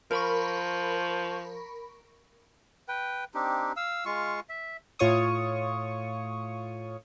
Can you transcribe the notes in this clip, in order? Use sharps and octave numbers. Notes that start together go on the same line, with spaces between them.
F3 A#4 B5 C#6
B4 G5
C4 D4 D#4 G4
F5 E6
G#3 F4 F5 C#6
E5
A2 F4 C#5 C#6 D#6